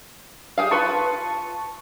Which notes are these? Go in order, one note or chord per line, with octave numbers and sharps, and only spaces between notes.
G4 G#4 F5
F4 B4 A5 C#6